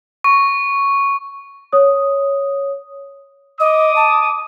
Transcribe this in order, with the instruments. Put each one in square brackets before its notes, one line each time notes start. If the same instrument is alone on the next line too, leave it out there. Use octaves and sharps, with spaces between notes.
[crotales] C#6
[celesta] C#5 D#6
[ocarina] D#5 [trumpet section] D6 D#6
[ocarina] A5